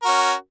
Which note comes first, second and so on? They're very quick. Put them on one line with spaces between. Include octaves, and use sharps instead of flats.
A#4 F#4 C#4